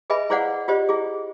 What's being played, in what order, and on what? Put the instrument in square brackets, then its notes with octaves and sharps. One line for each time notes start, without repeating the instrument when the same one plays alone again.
[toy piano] G#4 B4 D#5 E5 G#5 B5
E4 G#4 C5 D5 F5 F#5
F4 G4 C5 D5 D#5
E4 G#4